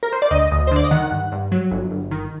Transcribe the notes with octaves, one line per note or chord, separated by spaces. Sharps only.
A#4
C5
D5
D2 D#5
D2
C5
D3 D5
D#5
D#3 F#5
G2
G2
F#3
G1
G1
D#3